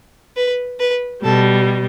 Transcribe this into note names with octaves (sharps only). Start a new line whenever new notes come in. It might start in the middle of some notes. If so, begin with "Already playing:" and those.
B4
B4
B2 G3 A4